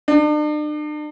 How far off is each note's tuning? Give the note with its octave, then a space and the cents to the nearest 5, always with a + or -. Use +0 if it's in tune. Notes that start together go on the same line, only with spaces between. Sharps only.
D4 +40